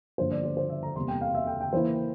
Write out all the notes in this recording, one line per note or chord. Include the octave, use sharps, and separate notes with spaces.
G2 D3 F3 A#3 C5
D5
C5
C5
E5
A#5
E2 C3 G3 A#3 C6
G5
F5
E5
G5
G5
E3 A#3 E4 C5